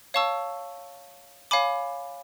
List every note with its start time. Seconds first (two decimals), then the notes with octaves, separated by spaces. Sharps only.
0.14 C#5 F5 A5 C#6 E6
1.51 C#5 F5 G#5 B5 D6